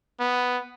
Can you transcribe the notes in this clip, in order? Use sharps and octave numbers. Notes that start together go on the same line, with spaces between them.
B3